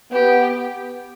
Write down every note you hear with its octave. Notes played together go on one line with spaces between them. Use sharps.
B3 G4